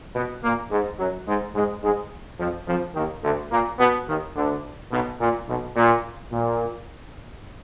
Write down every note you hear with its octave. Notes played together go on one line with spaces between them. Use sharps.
B2 B3
A#2 A#3
G#2 G#3
F#2 F#3
G#2 G#3
G#2 G#3
G#2 G#3
F2 F3
F2 F3
D#2 D#3
D2 D3
A#2 A#3
B2 B3
D#2 D#3
D2 D3
B1 B2
A#2
B1 B2
A#2
A#2